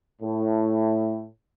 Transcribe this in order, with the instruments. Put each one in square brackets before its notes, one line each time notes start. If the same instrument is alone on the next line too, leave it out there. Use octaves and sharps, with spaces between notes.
[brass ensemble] A2